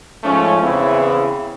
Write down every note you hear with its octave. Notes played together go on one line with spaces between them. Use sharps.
G#2 F3 A3 C#4
E2 C#3 E3 C4 E4